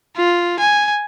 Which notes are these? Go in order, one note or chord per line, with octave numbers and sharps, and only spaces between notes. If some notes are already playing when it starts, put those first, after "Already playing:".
F4
G#5